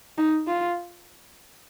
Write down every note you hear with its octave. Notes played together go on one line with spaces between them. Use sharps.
D#4
F4